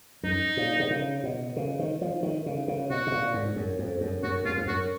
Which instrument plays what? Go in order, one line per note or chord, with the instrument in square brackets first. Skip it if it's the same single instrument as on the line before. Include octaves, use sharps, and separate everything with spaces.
[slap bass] F#2 [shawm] D#4
[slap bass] A#2
B2
C#3
B2
C#3
D#3
F3
D#3
C#3
C#3
[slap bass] B2 [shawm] F#4
[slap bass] B2
A#2
G#2
F#2
F2
F#2
[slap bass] F#2 [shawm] F#4
[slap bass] F#2 [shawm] F4
[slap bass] F2
[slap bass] F#2 [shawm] F#4